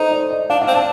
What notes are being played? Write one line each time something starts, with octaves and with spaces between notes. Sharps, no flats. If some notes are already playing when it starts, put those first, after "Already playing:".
Already playing: D#4 A4 C5
D5
D#5
D4 F5
F5
C4
D4 A5